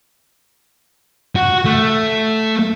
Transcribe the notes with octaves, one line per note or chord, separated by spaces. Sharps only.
F#4
A3